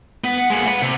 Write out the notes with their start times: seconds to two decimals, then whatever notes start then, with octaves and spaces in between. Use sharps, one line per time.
0.24 B3
0.38 F#5
0.50 G#3 A#3
0.68 F#5 B5
0.82 C3